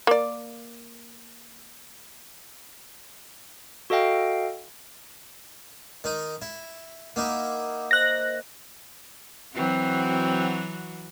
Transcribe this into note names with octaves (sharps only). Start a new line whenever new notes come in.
A#3 D5
F#4 A4 D#5 F5 G5
D#3 D#4
E4
A#3 D#4 E4 F#5 D6 E6
C5 D#5 F#6 A#6
E3 F#3 C4 F#4